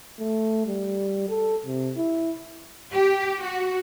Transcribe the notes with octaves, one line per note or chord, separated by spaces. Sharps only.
A3
G3
A4
C3
E4
G4
F#4